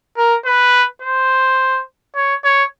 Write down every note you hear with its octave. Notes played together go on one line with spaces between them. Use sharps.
A#4
B4
C5
C#5
C#5